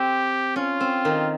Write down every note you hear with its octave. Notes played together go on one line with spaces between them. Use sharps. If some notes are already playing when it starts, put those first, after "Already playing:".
Already playing: C4 G4
C#4 F4
C4
D#3